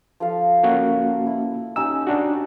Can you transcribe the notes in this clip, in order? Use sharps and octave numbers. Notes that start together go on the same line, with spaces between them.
F3 A4 F5
A#3 C#4 F#4
E4
C#4 D#4 G4 E6
D4 F#4